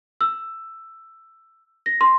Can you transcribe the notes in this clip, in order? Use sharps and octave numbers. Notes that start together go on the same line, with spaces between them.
E6
A#6
C6